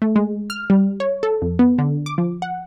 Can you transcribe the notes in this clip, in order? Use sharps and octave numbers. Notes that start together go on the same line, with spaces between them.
A3
G#3
F6
G3
C#5
A4
F2
B3
D3
D6
F3
F#5